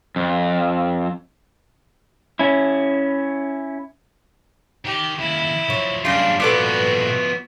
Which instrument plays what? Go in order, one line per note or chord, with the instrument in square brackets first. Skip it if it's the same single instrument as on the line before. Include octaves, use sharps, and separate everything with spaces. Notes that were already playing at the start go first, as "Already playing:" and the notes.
[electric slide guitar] F2
C#4 E4
[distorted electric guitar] D#3 [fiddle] G4
[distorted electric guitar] D#2 C#3 [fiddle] E4
[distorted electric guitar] F3 F#3 [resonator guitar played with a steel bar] C#5
[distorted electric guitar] F#2 [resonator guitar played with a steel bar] C#3 G3 [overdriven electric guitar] D4 F4 [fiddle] C6
[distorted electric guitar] A#2 G3 [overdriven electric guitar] F3 B3 [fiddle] F#4 [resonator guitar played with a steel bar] A4 B4 D5